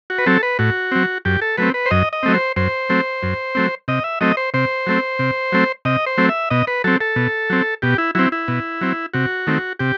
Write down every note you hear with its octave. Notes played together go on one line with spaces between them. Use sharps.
F#4
B4
F#3 C4 A4
B4
A2 F#4
F#3 C4
F#2 G4
A4
F#3 A3 C4 B4
B4
C5
F#2 D#5
D#5
F#3 A3 C4
C5
F#2 C5
F#3 A3 C4
F#2
F#3 A3 C4
C3 D#5
E5
F#3 A3 C4 D#5
C5
C3 C5
F#3 A3 C4
C3
F#3 A3 C4
C3 D#5
C5
F#3 A3 C4
E5
B2 D#5
B4
F#3 C4 A4
A4
B2
F#3 C4
B2 G4
E4
F#3 C4 E4
E4
B2
F#3 C4
C3 F#4
D#3 A3 C4
C3 G4